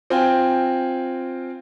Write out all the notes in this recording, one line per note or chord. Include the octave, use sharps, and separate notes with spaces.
C4 F4 G5 G#5